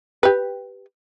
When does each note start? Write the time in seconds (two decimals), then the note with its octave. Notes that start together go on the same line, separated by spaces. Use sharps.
0.23 G4 B4